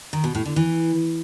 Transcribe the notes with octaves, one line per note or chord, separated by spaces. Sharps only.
D#3
B2
A2
D3
E3